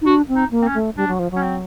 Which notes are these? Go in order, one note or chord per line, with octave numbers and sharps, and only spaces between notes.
D#4
D4 F#4
C4
D#4
A#3
C4
C#4
A3
G3 D4
F#3
F3
F#3
C#4
C4